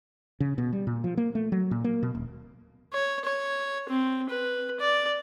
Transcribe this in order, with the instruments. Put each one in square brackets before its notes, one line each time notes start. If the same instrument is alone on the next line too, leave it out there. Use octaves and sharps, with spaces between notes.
[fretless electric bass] C#3
B2
G3
A#2
F3
A#3
A3
F#3
A#2
A#3
B2
D#1
[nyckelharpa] C#5
C#5
C4
B4
D5